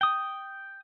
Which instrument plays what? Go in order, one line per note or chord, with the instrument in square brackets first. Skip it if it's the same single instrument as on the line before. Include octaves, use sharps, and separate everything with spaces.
[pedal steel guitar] G5 D#6